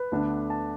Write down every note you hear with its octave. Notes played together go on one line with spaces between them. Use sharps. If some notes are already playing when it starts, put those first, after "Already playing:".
Already playing: B4
D2 D3 B3 D4
A5